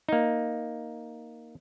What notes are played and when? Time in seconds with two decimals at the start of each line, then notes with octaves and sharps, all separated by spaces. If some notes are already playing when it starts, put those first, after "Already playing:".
0.09 A#3 D#4